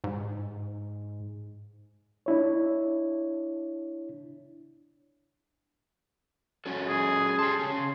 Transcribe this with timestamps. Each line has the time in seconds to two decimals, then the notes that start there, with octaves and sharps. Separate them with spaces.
0.04 G#2
2.26 D4 E4 C#5
6.66 C#4 F#4 A4
6.88 G#4
7.39 G4 A5 C6
7.59 C#3 C#4